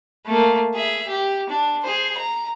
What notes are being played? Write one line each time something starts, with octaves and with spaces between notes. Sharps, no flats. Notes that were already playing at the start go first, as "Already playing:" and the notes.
A3 A#3
G#4 E5
G4
D4
G#4 C5
A#5